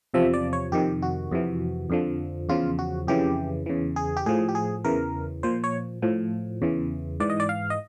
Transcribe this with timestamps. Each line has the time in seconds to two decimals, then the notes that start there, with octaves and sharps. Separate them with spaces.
0.14 E2 C3 F3 E5
0.34 D5
0.53 C#5
0.72 F2 C3 D#3 G4
1.02 F#4
1.31 F2 C3 E3
1.90 F2 D3 F3
2.49 E2 C#3 F3 F4
2.79 F#4
3.07 F2 C#3 E3 G4
3.66 E2 C#3 E3
3.96 G#4
4.17 G4
4.26 A2 F3 G#4
4.49 G4
4.55 G#4
4.84 E2 C#3 E3 A#4
5.43 A#2 F3 C5
5.64 C#5
6.02 A2 F3
6.62 E2 C#3 E3
7.20 G#2 E3 D5
7.30 D#5
7.40 D5
7.49 F5
7.70 D#5